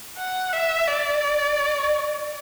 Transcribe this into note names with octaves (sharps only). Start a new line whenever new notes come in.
F#5
E5
D5